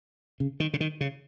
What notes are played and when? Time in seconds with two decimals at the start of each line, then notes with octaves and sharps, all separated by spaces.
0.40 C#3
0.60 D#3
0.73 C#3
0.80 D#3
1.01 C#3